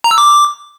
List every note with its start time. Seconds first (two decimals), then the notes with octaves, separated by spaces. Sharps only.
0.04 A#5
0.11 E6
0.18 D6